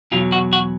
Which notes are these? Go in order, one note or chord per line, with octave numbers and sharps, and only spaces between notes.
E2 B2 F#3 F4
F#4
F#4